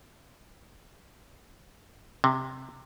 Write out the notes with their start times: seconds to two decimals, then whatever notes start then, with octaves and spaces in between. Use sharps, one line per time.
2.24 C3